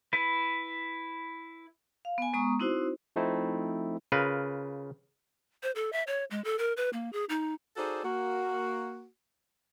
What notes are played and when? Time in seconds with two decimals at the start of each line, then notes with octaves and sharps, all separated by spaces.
0.13 E4 B4
2.05 F5
2.18 B3 G#5
2.33 G#3 B3 A#5 C#6 D#6
2.60 C4 D#4 E4 F#4 C5
3.16 F3 A3 C4 D#4 E4
4.12 C#3 F4 A#4 B4
5.63 C5
5.75 A4
5.93 E5
6.07 C#5
6.31 G#3
6.44 A4
6.59 A#4
6.77 B4
6.93 A#3
7.13 G#4
7.29 D#4
7.77 D#4 F#4 G#4 A4 C5 D5
8.04 A#3 F#4